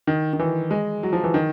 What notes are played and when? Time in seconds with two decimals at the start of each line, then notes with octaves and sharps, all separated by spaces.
0.07 D#3
0.33 D#3
0.39 E3
0.71 G#3
1.03 F#3
1.13 F3
1.24 E3
1.34 D#3